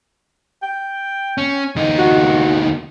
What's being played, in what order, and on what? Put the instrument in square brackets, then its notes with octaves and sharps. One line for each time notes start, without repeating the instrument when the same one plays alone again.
[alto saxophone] G5
[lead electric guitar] C#4
D2 D#4
[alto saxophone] F#4